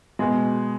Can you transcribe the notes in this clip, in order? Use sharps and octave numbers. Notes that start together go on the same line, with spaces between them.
B2 G#3